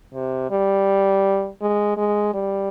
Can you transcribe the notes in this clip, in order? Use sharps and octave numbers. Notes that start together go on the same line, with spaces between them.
C3
G3
G#3
G#3
G3